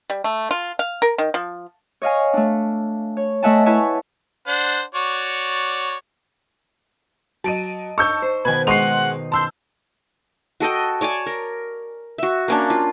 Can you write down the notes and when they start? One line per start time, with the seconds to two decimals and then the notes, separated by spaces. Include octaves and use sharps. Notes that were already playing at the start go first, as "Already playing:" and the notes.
0.10 G3
0.24 A3
0.51 F4
0.79 F5
1.02 A#4
1.18 D#3
1.34 F3
2.02 C#5 D#5 F5 G#5
2.33 A3 D4
3.17 C#5
3.43 A3 D#5 E5 F#5 G#5 A5
3.66 E4 B4 C#5 G#5 A5
4.47 D4 C5 F#5
4.95 F#4 C#5 D5
7.44 F#3 D#5 A5 D7 D#7
7.98 D#4 C#5 A5 C#6 E6 G6
8.22 C5
8.45 B2 D#3 B4 G#5 G#6
8.67 G#3 D#5 F#5 C6 C#6 D#6 C7 F7
9.32 A5 C6 E6 G6
10.60 F#4 A4 D#5 G5
11.01 C#5 D5 G#5 A5
11.26 A#4
12.18 F#4 E5
12.48 A#3 C#4 D4
12.70 F4